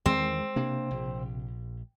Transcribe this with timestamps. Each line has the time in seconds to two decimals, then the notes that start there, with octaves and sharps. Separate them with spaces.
0.06 E2 D#3 E3 G#3 C4
0.56 C3 A#3 D4
0.91 A#1